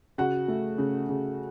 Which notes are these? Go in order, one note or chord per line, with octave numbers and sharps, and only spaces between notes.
C#3 F#4 F#5
A3
C#3
C#3